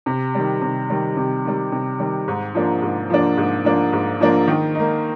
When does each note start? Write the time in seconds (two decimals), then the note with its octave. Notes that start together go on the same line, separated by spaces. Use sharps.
0.06 C3
0.35 D#3 G3
0.62 C3
0.90 D#3 G3
1.17 C3
1.45 D#3 G3
1.72 C3
1.99 D#3 G3
2.28 G#2
2.55 F3 A#3 D4
2.82 G#2
3.10 F3 A#3 D4
3.37 G#2
3.65 F3 A#3 D4
3.93 G#2
4.20 F3 A#3 D4
4.48 D#3
4.75 A#3 D#4